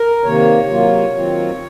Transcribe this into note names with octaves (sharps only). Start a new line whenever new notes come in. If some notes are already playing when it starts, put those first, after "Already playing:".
Already playing: A#4
C3 D#3 A#3 C#5
C3 F#3 A#3 F4
D#3 F#3 C4 F4